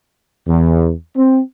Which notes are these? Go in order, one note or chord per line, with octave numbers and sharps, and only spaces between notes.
E2
C4